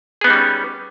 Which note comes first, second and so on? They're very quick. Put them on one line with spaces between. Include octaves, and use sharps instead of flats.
G#4 B3 D#4 G3 C#4